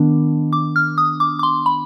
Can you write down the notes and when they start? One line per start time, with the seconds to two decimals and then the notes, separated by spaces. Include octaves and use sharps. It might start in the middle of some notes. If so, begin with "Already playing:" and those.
Already playing: D#3 B3 D4
0.53 D6
0.76 F6
0.98 D#6
1.20 D6
1.39 D6
1.43 C6
1.66 B5